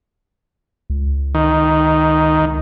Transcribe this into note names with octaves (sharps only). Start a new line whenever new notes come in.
C#2
D#3